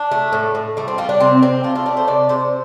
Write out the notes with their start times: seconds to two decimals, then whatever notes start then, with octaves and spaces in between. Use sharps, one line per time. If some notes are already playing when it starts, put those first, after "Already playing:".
Already playing: D4
0.11 A3
0.33 A2
0.55 A2
0.77 G3 A3
0.88 C4
0.98 G3 F4
1.09 D4
1.20 C3 C4
1.42 C3 C4
1.64 A3 F4
1.75 F4
1.86 A3 D5
1.97 C5
2.07 C3 D5
2.29 C3 C5